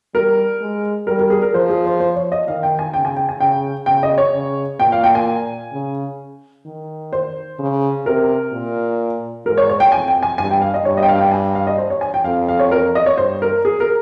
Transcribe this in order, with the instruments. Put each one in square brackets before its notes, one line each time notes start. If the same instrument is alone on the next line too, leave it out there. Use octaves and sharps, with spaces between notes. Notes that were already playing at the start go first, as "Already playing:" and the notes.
[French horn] G3 [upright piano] A#4
[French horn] G#3
[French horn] G3 [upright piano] A#4
[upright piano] A#4
G#4
A#4
[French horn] F3 [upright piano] C5
[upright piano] G#4
C5
C5
C#5
D#5
[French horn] D#3 [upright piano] F5
[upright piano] G5
G#5
[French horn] C#3 [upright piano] G5
[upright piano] G#5
G5
G#5
[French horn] C#3 [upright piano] G5
[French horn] C#3 [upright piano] G5
[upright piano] D#5
C#5
[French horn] C#3
[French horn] A#2 [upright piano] G5
[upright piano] F5
G5
G#5
[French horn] C#3
D#3
[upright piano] C5
[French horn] C#3
[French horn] C3 [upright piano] A#4
[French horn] A#2
[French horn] G#2 [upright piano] A#4
[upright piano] C#5
C#5
G5
[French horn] F2 [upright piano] G#5
[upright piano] G5
G#5
[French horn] G2 [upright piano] G#5
[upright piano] G5
F5
D#5
[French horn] G2 [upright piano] C#5
[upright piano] D#5
G5
F5
G5
G#5
F5
D#5
C5
C#5
G#5
G5
[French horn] F2 [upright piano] F5
[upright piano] F5
C#5
A#4
D#5
C#5
[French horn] G2 [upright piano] C5
[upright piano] A#4
G#4
A#4